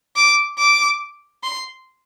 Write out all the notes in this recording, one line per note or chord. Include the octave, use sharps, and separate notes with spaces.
D6
D6
C6